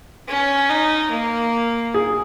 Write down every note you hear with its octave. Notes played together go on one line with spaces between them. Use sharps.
C#4
D#4
A#3
G#4